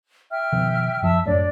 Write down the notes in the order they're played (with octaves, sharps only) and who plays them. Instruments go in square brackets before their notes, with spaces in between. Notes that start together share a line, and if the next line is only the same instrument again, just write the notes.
[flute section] E5 G5 F6
[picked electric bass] B2 D#3 F3
[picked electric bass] F#2 F3 F#3 [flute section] E5 A5 E6
[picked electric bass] F#1 F#2 A2 [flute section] D4 C#5 D5